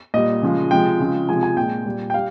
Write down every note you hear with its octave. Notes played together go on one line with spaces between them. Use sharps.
A#2 G3 D#5
C#3 F3 G#3
C3 F3 G#3 G5
C#3 F3 G#3
C3 F3 G#3 G#5
G#5
A#2 G#3 G5
A#2 G3
G5
G3 F5